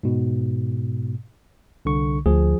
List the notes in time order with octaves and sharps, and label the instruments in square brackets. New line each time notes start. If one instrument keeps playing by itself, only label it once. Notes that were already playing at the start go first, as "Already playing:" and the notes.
[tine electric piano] G#2 B2
C2 D3 C#6
[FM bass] D2 [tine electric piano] F3 G#4